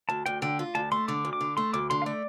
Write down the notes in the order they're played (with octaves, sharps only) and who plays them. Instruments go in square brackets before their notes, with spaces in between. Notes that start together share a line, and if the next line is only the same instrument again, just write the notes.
[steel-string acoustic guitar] D2 [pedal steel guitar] A5
[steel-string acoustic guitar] D2 [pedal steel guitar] G5
[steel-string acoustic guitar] D3 [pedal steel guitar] G5
[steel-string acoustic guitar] F4
[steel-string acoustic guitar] D2 [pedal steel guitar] A5
[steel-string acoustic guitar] A3 [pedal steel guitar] C6
[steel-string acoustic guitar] D3 [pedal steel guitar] D6
[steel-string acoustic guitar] D2
[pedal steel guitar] D6
[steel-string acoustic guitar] D3
[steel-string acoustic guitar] A3 [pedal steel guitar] C6
[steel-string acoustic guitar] D2 [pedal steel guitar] D6
[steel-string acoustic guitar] D3 [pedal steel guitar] C6
[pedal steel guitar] F5
[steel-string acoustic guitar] A3 [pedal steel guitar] D5